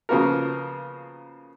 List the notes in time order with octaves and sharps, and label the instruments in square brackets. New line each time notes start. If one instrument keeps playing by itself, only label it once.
[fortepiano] C#3 F3 A#3 B3 F#4 A#4